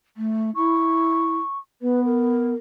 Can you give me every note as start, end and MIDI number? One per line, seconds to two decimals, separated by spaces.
0.17 0.50 57
0.56 1.36 64
0.56 1.59 85
1.82 2.53 59
1.82 2.03 71
2.05 2.55 70